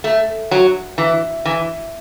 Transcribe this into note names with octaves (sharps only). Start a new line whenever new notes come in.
A3
F#3
E3
E3